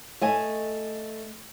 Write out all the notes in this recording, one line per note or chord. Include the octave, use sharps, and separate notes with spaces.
A3 D#5 G#5